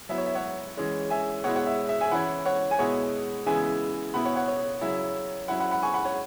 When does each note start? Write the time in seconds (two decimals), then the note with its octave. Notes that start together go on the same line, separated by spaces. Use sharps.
0.09 F#3 B3 E4 E5
0.18 C#5
0.26 E5
0.35 C#5 F#5
0.77 E3 G#3 C#4
1.10 E5 G#5
1.44 B2 G#3 E4 C#5 F#5
1.56 C#5 F#5
1.66 E5
1.89 E5
2.00 E5 G#5
2.11 E3 C#4 E4 F#5 B5
2.45 C#5 F#5
2.71 G#5
2.79 B2 G#3 B3 E4 C#5 F#5
3.46 C#3 E3 G#3 B3 E4 E5 G#5
4.14 B2 B3 E4 F#5 B5
4.25 C#5 F#5
4.36 C#5 F#5
4.48 C#5
4.81 C#3 F#3 C#4 E4 E5
5.48 F#3 C#4 E4 F#5 B5
5.60 F#5 B5
5.72 F#5 B5
5.83 G#5 C#6
5.94 F#5 B5
6.05 C#5 F#5